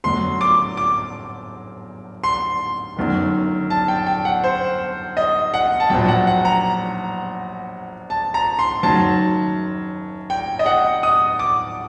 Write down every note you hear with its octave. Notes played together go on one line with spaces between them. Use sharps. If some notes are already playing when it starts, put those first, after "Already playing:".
G1 F#2 F#3 C6
D6
D6
C6
G1 F#2 D#3
A5
G5
G5
F#5
C5
D#5
F#5
A5
A#1 A#2 F#3 G5
F#5
F#5
A#5
A5
A#5
C6
F#1 F#2 D#3 F#3 A5
G5
D#5
F#5
D#6
D6